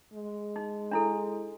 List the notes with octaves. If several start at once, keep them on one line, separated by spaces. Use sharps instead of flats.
G#3
D#4
D4 E4 A4